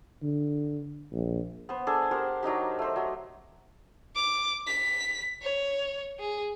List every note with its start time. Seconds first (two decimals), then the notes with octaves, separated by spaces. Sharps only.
0.23 D3
1.12 A#1
1.69 B3 C5
1.87 D4 G#4 A4
2.11 G4 A#4 C5 F#5
2.43 F#3 D4 D#4 G4
2.79 A3 C5
2.96 F#3
4.16 D6
4.67 B6
5.42 C#5
6.20 G#4